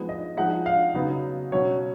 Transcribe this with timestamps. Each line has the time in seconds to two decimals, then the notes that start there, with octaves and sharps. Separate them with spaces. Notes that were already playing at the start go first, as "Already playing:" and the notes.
Already playing: F3 G#3 B3 D#4
0.09 D#5
0.37 F3 G#3 D#4 F#5
0.66 F5
0.94 C#3 F#3 B3 D#4
1.52 B2 F#3 C#4 C#5